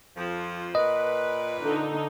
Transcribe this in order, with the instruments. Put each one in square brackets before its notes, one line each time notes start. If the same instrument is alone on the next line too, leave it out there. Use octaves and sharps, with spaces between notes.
[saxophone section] F2 F3
[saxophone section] A#2 B4 [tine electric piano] D#5
[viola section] D3 D#4